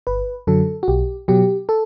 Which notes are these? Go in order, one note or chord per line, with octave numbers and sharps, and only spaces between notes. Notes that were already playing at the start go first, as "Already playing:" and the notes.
G1 B4
F#2 D3 F#3 A4
F#4
B1 G4
B2 F#3 G4
A4